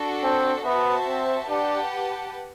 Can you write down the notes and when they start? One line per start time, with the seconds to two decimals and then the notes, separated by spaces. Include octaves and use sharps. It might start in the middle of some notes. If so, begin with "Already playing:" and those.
Already playing: D4 F#4 A4
0.24 C4
0.66 B3 F#4 C5 E5 A5
1.08 C4
1.50 D4 G4 B4 F#5 A5